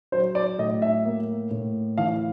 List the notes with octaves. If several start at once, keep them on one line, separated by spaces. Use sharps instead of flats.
F#3 C5
D5
A2 D#5
E5
A#3
A2
E3 F5